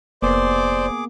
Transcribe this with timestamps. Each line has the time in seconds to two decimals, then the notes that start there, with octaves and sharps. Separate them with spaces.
0.22 F1 A#3 B3 G#4 C5 D5 D6